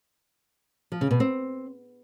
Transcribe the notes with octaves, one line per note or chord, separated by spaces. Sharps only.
F3
C#3
B2
C4